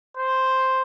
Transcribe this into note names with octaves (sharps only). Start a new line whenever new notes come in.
C5